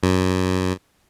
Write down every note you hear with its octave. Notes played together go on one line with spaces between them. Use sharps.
F#2